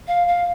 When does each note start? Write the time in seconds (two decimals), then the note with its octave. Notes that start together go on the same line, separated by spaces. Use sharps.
0.07 F5
0.28 F5